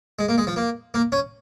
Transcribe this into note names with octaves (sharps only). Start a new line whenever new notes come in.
G#3
A#3
G#3
F3
A#3
A#3
C#4